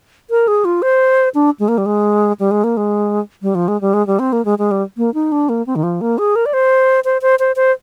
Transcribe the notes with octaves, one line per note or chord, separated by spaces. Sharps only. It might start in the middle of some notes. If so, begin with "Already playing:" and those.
A#4
G#4
F4
C5
D4
G#3
A#3
G3
G#3
G3
G#3
A#3
G#3
G3
F3
G#3
G3
G#3
G3
C4
A#3
G#3
G#3
G3
A#3
D#4
D4
A#3
C4
D#3
F3
A#3
G#4
A#4
D5
C5
C5
C5
C5
C5